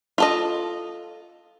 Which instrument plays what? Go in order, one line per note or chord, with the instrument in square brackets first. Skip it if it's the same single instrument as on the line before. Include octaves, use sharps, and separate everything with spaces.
[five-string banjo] F4 A4 D#5